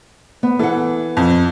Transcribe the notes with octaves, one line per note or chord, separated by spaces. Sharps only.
B3
E3 A4 F#5
F2